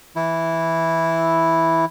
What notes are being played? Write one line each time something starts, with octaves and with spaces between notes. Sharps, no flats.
E3 E4